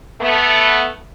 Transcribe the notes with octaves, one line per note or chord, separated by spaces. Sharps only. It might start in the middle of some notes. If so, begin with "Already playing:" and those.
A3 B3